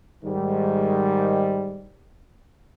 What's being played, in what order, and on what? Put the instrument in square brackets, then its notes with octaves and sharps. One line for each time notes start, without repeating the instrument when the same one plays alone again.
[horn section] G#2 D#3 G3